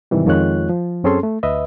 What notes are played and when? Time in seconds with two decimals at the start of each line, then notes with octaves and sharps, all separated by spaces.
0.11 G#2 C3 D#3 E3 G3
0.26 F2 D#3 G#3 F4 C#5 F#6
0.69 F3
1.04 F#2 C4 C#4 G#4 A4 C6
1.23 A3
1.43 D2 B4 D#5 E5